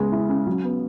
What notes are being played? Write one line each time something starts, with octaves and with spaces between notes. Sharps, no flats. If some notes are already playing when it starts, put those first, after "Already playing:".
Already playing: C#3 G#3 B3
E4
C#4
F#3
B3